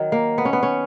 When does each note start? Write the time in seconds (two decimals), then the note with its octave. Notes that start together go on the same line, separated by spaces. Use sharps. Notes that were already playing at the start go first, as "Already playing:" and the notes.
Already playing: D#3 F#3
0.12 A#3
0.38 B3
0.45 C#4
0.53 B3
0.63 C#4